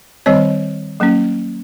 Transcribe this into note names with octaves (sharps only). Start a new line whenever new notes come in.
D#3 G3 C4 C#5 D#5
F#3 A#3 C#4